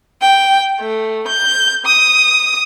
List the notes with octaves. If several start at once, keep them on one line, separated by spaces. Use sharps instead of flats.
G5
A3
G6
D#6